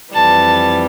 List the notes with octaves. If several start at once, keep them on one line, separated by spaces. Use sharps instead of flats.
F2 E3 G3 A5